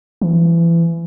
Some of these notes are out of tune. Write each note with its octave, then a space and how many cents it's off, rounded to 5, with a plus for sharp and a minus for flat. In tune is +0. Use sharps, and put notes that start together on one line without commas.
E3 +30